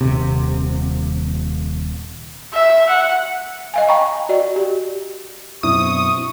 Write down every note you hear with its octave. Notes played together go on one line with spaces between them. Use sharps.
D#1 C3
E5
F#5
D#5 F5 G#5
D#5 G5 A#5 B5 C#6
F#4 D5 D#5
G4
F#2 B2 C4 D4 E4 C#6 D#6